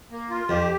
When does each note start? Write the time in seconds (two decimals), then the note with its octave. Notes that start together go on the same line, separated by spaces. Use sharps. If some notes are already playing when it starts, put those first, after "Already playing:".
0.11 A#3
0.30 F4
0.49 F2 G4